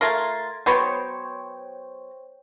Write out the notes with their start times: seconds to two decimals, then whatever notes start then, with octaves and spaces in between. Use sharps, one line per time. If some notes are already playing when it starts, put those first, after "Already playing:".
0.01 A3 F4 A#4 C6 G#6 A6
0.66 F#3 B3 C5 C#5 G5